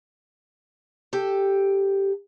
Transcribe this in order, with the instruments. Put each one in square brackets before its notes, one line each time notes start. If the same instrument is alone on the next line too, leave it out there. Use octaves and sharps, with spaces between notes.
[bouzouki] G4 A4